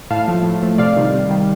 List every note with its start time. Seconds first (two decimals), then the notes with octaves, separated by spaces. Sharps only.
0.11 A2 F5 A5
0.28 F3 A3
0.44 A2
0.62 F3 A3
0.78 C3 D5 F5
0.96 D#3 G3
1.14 C3
1.30 D#3 G3